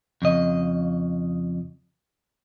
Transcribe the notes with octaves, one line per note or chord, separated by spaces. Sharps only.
F2 C#3 D#5